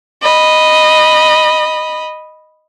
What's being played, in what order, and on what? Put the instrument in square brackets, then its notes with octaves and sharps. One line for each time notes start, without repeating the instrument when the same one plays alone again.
[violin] D#5 B5